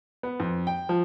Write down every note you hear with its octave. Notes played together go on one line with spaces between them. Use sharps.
B3
F2
G5
F3